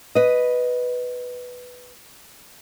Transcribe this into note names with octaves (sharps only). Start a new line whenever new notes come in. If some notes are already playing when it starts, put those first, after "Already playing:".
B4 D#5